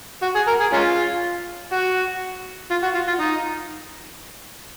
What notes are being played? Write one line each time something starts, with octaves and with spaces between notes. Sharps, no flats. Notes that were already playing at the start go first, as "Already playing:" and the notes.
F#4
G#4
A#4
G#4
G#3 C#4 F4
F#4
F4
F#4
F4
F4
D#4